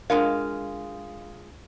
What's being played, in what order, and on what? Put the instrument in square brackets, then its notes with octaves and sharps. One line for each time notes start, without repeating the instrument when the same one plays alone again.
[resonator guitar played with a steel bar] G#3 F4 F5 [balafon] D4 A#4